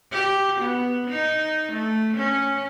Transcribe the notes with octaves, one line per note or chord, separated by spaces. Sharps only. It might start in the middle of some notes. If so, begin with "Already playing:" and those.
G4
B3
D#4
A3
C#4